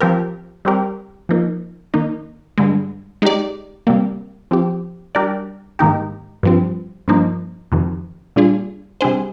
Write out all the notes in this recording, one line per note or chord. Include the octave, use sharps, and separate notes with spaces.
F3 C4 G4 A#4
G3 C4 G4 A#4
F3 A#3 D#4
D#3 A#3 D#4
G2 D3 G#3
G#3 D#4 G4 D5
C3 G3 A#3
F3 C4 G4
G3 D4 G4 A#4 D5
G#2 D#3 A#3 D#4 G4
G2 F3 C4
G2 F3 A#3 D#4
F2 C3 D#3
A#2 G3 D4 F4 G#4
C3 G3 D4 G#4 C5